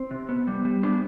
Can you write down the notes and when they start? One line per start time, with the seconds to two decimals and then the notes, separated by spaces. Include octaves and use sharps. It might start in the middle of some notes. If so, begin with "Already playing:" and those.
Already playing: C4
0.11 C3
0.29 B3
0.47 G3
0.65 G3
0.83 C3 B3 D4